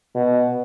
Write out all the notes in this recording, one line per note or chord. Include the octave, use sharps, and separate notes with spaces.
B2